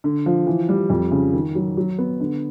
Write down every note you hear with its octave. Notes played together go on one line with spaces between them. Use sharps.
D3
F3
E3
G3
F2
C#3
D#3
F#3
F#3
B3
D3